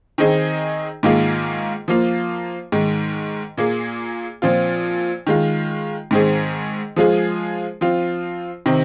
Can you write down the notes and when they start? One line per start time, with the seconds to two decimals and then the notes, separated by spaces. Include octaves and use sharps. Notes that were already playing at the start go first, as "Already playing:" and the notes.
0.18 D#3 C4 D#4 G#4
1.03 G#2 D#3 A#3 F4 G#4
1.88 F3 A#3 F4
2.72 G#2 D#3 G#3
3.57 A#2 A#3 G#4
4.42 A#2 F3 C4 F4
5.27 D#3 G#3 F4
6.11 G#2 D#3 C4 G#4
6.96 F3 G#3 F4 G#4
7.81 F3 C4 F4
8.66 C3 D#3 C4